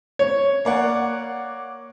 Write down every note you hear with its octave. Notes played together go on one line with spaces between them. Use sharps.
C#5
A#3 D5 F#5